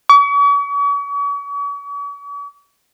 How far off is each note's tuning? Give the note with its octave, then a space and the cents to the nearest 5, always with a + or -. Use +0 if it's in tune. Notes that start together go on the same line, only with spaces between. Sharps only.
C#6 +45